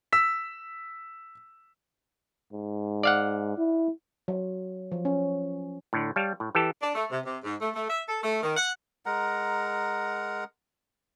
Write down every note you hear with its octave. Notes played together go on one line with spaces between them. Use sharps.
E6 B6
G#2
D5 F5 F#5
E4
F#3
F3
C#4
A2 D3
G3 C#5 F5 A5
A2
E3 G4 A4 A5
D4
A3
C3
C3
G#2
A3
A3
E5
A4
A3
D#3
F#5
G#3 A#4 F#5 A#5